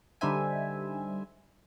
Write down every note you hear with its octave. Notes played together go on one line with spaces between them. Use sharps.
D3 G3 D#4 C5 E5 G#5